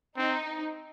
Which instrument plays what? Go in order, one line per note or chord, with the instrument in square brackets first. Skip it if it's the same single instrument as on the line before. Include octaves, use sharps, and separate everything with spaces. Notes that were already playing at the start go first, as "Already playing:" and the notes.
[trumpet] C4 [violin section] D#4